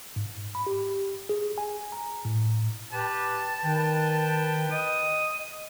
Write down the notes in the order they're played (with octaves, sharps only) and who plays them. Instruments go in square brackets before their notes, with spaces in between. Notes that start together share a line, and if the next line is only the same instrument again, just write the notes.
[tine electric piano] G#2
B5
G4
G#4
G#5
A#5
A2
[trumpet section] G4 B4 [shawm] A5
[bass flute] D#3 [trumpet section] B4 G5
[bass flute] D#5 [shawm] D#6